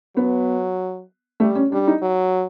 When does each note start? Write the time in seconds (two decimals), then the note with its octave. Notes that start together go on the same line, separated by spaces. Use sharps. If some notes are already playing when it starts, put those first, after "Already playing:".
0.16 F#3 B3
1.40 G3 A3
1.55 C#4
1.72 G3 D4
1.87 D#4
2.02 F#3